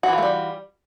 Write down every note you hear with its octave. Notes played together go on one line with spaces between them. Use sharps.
E3 G3 A3 F4 F#4